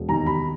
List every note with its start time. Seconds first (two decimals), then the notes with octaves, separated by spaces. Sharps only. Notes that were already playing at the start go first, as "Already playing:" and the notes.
Already playing: E1
0.09 D#2 A#5
0.26 B5